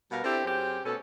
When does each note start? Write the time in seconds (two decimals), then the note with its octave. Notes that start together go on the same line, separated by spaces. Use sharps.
0.11 B2 G3 F#4 A#4 B4 F5
0.24 C4 D4 E4 G4 A4 C5
0.45 F#2 C4 C#4 G4 G#4 C5
0.85 B2 A3 B3 C#4 A4